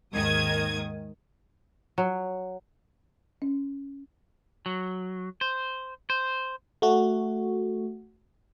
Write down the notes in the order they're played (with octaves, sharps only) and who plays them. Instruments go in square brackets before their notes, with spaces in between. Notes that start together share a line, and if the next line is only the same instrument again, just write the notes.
[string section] D#2 G#2 D#3 D#6 G#6
[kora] F#3
[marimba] C#4
[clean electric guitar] F#3
C5
C5
[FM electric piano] A3 F#4